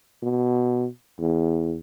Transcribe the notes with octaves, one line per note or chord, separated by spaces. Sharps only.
B2
E2